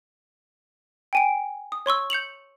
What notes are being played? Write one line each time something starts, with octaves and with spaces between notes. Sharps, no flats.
G5 G#5 D7
D#6
C#5 C6 C#6 E6
G6 C#7 F7 F#7